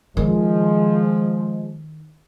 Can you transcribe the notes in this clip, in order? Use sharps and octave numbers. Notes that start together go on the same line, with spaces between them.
D#3 F3 G#3